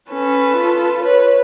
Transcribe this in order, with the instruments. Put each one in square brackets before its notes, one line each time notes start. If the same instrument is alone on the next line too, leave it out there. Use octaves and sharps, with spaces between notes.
[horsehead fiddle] C#4 [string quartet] A4 B4
[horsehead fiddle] F4
[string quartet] B4 C#5